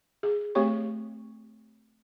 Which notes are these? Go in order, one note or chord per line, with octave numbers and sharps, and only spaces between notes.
G#4
A3 C4 G4 C#5 C#6